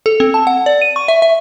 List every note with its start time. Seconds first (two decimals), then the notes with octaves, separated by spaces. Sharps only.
0.06 A4
0.20 C4
0.34 A5
0.47 F#5
0.66 D5
0.82 D#7
0.96 C#6
1.08 E5
1.22 E5